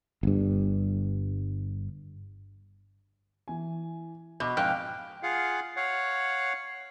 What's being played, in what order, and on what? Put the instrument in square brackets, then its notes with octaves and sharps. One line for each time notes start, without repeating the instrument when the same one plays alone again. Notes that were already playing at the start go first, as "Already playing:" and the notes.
[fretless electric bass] G1 G2
[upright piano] E3 G#5
[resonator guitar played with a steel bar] B2 [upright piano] D#5 D6
[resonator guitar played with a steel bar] F2 G#2 [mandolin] F5 F#6 [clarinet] G5
[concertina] F4 G#4 F5 F#5
C#5 F5 F#5